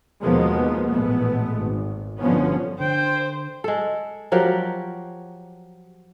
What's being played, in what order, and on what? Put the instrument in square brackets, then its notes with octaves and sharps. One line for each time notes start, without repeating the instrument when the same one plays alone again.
[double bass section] D#2 B2 F3 G#3 A#3 B3
A1 A#2 G#3 A3 B3
G#1
G1 B2 D3 F3 B3 C#4
[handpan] D3 [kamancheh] C5 [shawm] G5
[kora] G#3 A4
F3 F#3 G4 A#4